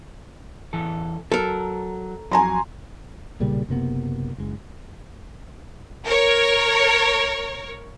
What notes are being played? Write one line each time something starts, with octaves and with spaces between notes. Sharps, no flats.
E2 E3 A4
F#3 A4 A#4
F2 F#3 G#5 A#5 C6
B1 A#2 C#3 G3
F#1 C3 A#3 B3
F#1 G#3
A#4 C#5